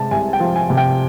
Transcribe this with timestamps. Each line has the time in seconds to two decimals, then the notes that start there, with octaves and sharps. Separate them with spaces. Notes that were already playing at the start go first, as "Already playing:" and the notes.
Already playing: C3 G#3 A5
0.11 C2 G#5
0.33 G5
0.40 F3
0.56 G#5
0.70 C3
0.77 G5